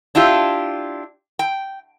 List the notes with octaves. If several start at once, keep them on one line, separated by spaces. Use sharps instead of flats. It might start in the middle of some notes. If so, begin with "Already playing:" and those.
D4 E4 F4 G4
G5